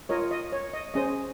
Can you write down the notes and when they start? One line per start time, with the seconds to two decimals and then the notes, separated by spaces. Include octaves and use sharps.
0.09 F4 A#4 C#5 D#5
0.31 D#5
0.52 C#5
0.74 D#5
0.94 C#4 G#4 C5 D#5